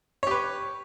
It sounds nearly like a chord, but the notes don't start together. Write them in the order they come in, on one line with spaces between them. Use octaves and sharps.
C#5 G4 B4